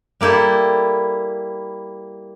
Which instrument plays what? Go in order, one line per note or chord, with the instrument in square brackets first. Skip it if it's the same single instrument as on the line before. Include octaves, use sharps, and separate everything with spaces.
[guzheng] G3 A#3 E4 G4 A4